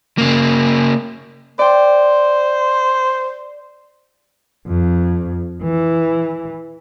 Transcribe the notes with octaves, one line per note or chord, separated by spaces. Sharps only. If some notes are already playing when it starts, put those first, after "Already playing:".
C#3 A#3
C5 D5 G5
F2
E3